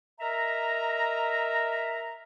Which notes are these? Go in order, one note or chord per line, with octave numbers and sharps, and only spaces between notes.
A#4 D#5 E5 A#5